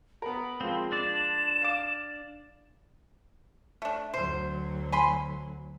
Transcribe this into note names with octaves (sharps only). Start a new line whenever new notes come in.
B3 A#4 B5
F3 G#3 A#3 C4
D4 D5 E7
F5 D6
A3 D4
D2 F#3 C5
G#5 B5 C6